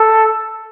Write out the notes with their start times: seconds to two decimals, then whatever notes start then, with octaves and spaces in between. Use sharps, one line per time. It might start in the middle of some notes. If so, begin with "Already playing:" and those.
Already playing: A4